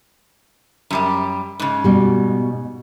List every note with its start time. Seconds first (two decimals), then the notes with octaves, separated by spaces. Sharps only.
0.90 F#2 G3 G4
1.59 G#2 C#3
1.84 B2 G3